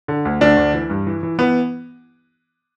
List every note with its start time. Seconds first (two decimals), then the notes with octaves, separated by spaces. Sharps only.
0.08 D3
0.25 D2
0.41 D2 D4
0.57 D2
0.74 E3
0.90 G2
1.07 E3
1.23 E3
1.38 E3 B3